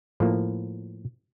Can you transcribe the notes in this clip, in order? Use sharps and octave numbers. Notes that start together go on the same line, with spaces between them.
A2 F3 A#3